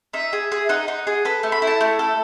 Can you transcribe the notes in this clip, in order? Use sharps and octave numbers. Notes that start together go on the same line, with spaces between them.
D#4 E5
G#4
G#4
D#4 F#5
D#4
G#4
A4 B4
A3
B5
E4
A5
A3
A4